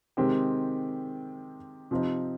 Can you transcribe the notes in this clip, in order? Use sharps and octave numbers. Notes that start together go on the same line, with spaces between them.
C3 D#3 G#3 C4 G4
C3 F3 C4 D#4